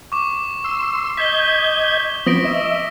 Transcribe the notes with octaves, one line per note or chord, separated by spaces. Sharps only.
C#6 D6
C6 E6
D#5 G6 G#6 B6 G7
F3 B3 C4 D#6 A#6 D7
D#5 E5